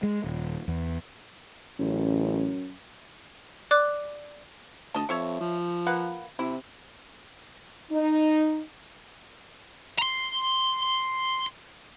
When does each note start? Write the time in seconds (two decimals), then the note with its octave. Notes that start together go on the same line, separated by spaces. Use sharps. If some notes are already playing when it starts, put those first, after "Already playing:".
0.03 G#3
0.24 D#1
0.68 E2
1.79 A1 F#2
3.71 D5 D6 F#6
4.94 D2 D#5 A5
5.09 F2 C#5 E5 C#6
5.41 F3
5.87 A#3 B4 F#5
6.39 C3 E4
7.92 D#4
9.99 A#5 C6